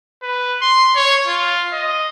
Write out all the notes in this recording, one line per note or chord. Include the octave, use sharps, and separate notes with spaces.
B4
C6
C#5
F4
D#5